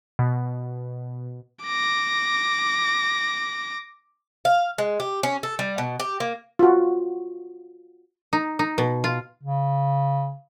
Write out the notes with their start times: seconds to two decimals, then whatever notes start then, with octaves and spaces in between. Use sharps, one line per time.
0.19 B2
1.64 D6 A#6
4.45 F5
4.78 G#3
5.00 G4
5.23 C#4
5.43 A4
5.59 G3
5.78 B2
6.00 G4
6.20 A#3
6.59 F4 F#4
8.33 D#4
8.59 D#4
8.78 B2
9.04 F4
9.43 C#3